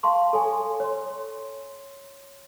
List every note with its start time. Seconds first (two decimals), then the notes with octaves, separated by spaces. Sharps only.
0.03 F5 A5 C6 C#6
0.33 A4 C#5 G#5 C6
0.80 C#5 C6